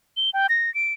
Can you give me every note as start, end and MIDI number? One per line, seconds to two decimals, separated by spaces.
0.17 0.30 103
0.34 0.47 79
0.49 0.73 94
0.74 0.93 98